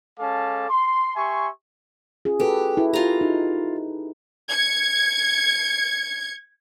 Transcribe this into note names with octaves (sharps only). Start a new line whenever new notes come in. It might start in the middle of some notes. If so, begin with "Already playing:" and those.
G#3 C#4 A4 F5 A5 D6
C6
G4 E5 G#5 C6 C#6
C#4 F4 G#4
F#4 G4 A4 B4
E4 B4
F4 G4 A#5
D#4
G#6 C#7